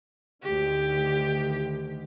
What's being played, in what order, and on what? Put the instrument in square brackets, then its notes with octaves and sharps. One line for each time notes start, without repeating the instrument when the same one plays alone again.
[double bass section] D2 D#3 [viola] G4